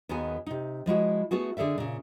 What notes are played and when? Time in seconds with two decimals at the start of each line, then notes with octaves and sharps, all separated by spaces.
0.09 D#2 D#3 B3 F#4 G#4 G#5
0.46 C3 D#4
0.86 F3 G#3 E4 F#4
1.31 A3 B3 F#4 G#4
1.57 D3 G#4 A4 D5 E5
1.78 A#2 C#3